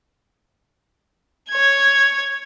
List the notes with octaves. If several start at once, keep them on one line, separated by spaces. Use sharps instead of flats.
C#5 G#6